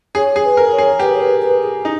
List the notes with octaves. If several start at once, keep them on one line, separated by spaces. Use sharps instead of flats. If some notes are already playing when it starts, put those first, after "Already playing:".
G#4 C#5
G#4
B4
A#4
C#5
G#4
G4 B4
C#5
B4
B4
G#4
D#4